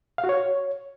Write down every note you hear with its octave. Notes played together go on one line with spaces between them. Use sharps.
F5
F#4
C#5